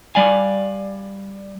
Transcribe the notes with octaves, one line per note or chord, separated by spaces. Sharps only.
G3 D5 F5 G#5